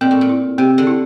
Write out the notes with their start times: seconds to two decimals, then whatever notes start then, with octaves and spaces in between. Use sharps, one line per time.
0.01 A#2 C4
0.11 A2
0.21 A#2
0.29 E4
0.58 C3 C4
0.78 D3
0.87 E4